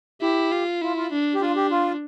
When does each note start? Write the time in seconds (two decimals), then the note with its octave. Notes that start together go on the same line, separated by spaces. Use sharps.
0.22 E4 G4
0.52 F4
0.82 E4 F4
0.97 F4
1.12 D4
1.35 G4
1.41 D4 F4
1.56 G4
1.71 F4